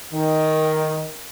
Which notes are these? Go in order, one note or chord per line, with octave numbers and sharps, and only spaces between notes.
D#3